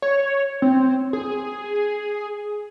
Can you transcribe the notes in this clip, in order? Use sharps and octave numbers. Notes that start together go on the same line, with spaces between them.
C#5
C4
G#4